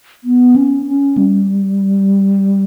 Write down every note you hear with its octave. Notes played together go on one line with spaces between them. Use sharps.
B3
C#4
C#4
G3